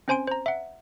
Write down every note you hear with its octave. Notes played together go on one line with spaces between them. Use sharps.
C4 C#4 C5 G#5 C6 D7
C5 A#5
E5 F#5